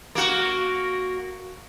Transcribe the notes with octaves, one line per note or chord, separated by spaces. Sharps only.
A#3 F#4